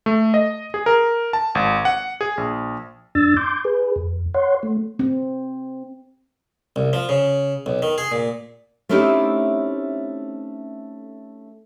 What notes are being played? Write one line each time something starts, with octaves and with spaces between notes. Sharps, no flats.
A3
D#5
G#4
A#4
A5
G#1
F#5
G#4
A#1
F#2 D4 E6 A6
C6 D6 G6
G#4 B4
F2
C#5 F#5 C6
A3
C4
C2
F3
C#3
B1
D#3
G#4
A#2
A3 C4 C#4 D#4 E4 G4